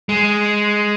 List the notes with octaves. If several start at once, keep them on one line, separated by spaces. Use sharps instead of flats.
G#3